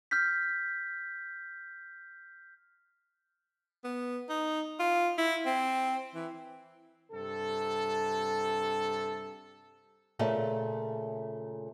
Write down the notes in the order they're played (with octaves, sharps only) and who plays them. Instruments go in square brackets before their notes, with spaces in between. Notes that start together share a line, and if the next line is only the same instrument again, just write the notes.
[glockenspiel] F6 G6 B6
[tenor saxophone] B3
D#4
F4
E4
C4
E3
[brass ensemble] G2 C3 A4
[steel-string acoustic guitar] A#2 C#3 A3